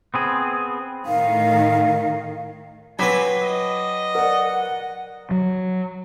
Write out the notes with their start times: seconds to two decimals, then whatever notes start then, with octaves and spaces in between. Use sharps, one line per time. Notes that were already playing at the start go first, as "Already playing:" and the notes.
0.14 B3 C4 G#4
1.06 A2 D#3 F5
2.99 F#3 C4 B4 G#5 B5 D6 B6
3.44 D#5
4.15 A#4 D5 F#5
5.31 F#3